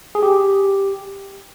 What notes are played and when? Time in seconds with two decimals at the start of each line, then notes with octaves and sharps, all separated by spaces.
0.15 G#4
0.23 G4